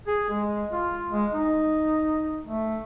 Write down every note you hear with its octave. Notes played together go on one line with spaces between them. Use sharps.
G#4
G#3
F4
G#3
D#4
A3